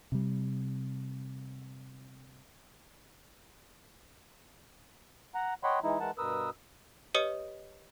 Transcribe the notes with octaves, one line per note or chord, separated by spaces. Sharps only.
C3 G3
F#5 A#5
C#5 D#5 F#5 G5 B5 C6
E3 G#3 D#4 E4
E3 G#3 A#4 F#5 A5
G2 B2 A#4 B4 D#6 E6
G4 B4 C#5 D#5 D#6 C#7